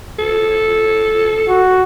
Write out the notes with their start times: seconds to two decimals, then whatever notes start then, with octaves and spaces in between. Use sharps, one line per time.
0.19 A4
1.48 F#4